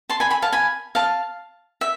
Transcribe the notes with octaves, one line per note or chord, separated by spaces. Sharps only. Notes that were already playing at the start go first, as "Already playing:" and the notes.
A5 C6
G#5 B5
G#5 B5
F5 A5
G#5 B5
F5 A5
E5